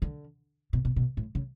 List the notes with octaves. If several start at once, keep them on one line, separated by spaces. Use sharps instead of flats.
D3
B2
B2
B2
A2
C#3